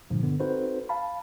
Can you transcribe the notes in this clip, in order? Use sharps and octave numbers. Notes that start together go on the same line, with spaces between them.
G2 A#2 D3 F3
D3 B3
C4 D#4 F#4 A4 B4 C5
F5 A5 B5